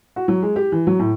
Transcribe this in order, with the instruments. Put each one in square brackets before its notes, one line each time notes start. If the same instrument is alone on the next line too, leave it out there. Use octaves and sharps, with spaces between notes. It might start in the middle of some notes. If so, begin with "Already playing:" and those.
[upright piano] F#4
F#3
G#3
G4
E3
F#3
A2